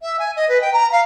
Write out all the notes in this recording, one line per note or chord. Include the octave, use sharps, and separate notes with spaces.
E5
G#5
D#5
B4
G5
A#5
F5